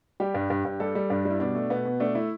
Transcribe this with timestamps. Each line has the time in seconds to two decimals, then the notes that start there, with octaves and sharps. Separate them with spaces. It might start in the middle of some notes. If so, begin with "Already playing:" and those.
0.20 G3 G4
0.34 G2
0.50 G2
0.65 G2
0.80 G3 A4
0.95 G3
1.10 G2 D4
1.25 G3
1.30 E4
1.40 B2 D4
1.55 A3
1.70 B2 B3
1.85 B2
2.00 A3 D4
2.15 A3 E4